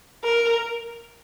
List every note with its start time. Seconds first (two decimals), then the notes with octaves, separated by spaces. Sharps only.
0.24 A#4